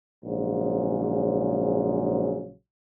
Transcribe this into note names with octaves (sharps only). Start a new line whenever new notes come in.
A#1 G#2 C#3 F#3